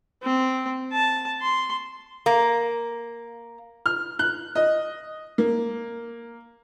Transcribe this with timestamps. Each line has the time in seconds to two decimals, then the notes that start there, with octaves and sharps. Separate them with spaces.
0.23 C4
0.93 A5
1.42 C6
2.26 A#3
3.86 F6
4.19 F#6
4.56 D#5
5.38 A#3